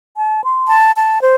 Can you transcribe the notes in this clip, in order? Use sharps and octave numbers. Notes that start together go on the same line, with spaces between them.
A5
C6
A5
A5
C5